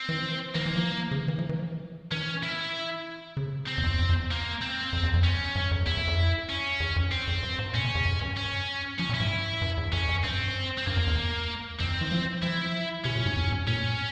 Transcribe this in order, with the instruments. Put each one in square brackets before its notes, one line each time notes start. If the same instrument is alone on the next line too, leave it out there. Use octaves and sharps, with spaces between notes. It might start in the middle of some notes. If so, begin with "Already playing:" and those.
Already playing: [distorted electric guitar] C4
[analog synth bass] E3
[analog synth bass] E3 [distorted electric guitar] A#3
[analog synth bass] E3
F3
C#3
E3
E3
F3
E3
[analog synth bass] E3 [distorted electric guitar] C#4
[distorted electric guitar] E4
[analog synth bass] C#3
[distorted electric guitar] C4
[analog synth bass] E2
F2
F2
F2
E2
[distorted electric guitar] A#3
C4
[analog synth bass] F2
E2
F2
[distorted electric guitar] C#4
[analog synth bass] G2
F2
[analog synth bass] E2 [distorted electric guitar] E4
[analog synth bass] G2
F2
[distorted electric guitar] C#4
[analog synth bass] E2
F2
[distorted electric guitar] C4
[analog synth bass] F2
G2
G#2
[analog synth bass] A#2 [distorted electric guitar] C#4
[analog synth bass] C3
E2
F2
G2
[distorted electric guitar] C#4
[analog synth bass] F3 [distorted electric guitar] C#4
[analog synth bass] A#2
[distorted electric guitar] E4
[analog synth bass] G#2
G2
E2
[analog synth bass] F2 [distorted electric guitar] C#4
[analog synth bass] F2
[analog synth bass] G2 [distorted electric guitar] C4
[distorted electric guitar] C4
[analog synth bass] G2 [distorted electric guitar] A#3
[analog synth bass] E2
E2
[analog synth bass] F2 [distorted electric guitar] C4
[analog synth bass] E3
F3
[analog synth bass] F3 [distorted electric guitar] E4
[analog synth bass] C3 [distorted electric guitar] C#4
[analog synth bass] A#2
G#2
F2
G2
[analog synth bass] A#2 [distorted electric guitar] C#4